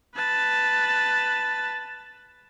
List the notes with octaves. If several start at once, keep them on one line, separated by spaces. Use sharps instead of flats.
B4 A5